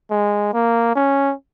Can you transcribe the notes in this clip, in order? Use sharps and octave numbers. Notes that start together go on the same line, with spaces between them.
G#3
A#3
C#4